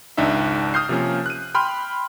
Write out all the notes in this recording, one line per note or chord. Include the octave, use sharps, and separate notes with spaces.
G#1 C#2 D4 D#4 E5
D#6 F6 G6 C7
C3 F3 A#3 C#4
F#6 D#7
G5 B5 C6 F6